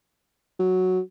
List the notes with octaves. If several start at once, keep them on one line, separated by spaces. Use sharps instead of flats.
F#3